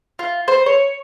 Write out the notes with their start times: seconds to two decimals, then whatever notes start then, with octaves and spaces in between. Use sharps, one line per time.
0.19 F4
0.48 C5
0.66 C#5